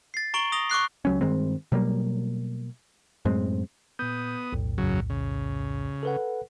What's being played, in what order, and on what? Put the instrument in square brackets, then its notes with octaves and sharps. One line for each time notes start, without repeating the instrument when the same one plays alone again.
[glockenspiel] A6 C7
A#5 C#6 D7 F#7 G7
D#6 A#6 F7 G7
C#6 D6 F#6 C7
[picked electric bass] C#2 F#3 C#4
G2 D#3 G#3 C4
B2 F#3 G3 A#3
F#2 A2 G#3 C4
[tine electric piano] A#2 G6 [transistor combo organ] B3 D#6
[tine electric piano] B1 E2 A2
[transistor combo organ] F#2 C#3 F#3
C#3
[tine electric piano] A4 B4 F#5